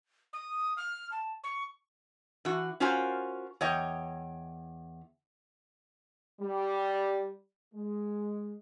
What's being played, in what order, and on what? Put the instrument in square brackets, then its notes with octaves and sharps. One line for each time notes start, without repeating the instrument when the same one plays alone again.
[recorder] D#6
F6
A5
C#6
[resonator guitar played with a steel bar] E3 F#4
C#4 F4 F#4 A#4 C5 G#5
E2 C#5 D#5 G5
[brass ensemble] G3
G#3